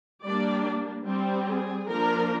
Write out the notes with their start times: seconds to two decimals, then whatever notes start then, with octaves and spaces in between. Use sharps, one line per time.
0.25 G3 A#3 D4 D5
1.06 G3 C4
1.47 G#4
1.87 F3 A#3 D4 A#4